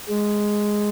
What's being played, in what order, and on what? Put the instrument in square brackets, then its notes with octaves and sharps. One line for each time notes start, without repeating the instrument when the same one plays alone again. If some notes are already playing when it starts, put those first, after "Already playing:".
[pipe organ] G#3